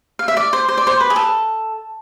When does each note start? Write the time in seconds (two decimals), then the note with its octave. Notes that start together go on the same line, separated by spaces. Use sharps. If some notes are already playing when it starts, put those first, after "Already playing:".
0.19 F5
0.28 E5
0.37 D5
0.53 C5
0.68 C5
0.78 D5
0.87 C5
1.00 B4
1.10 G#4
1.16 A4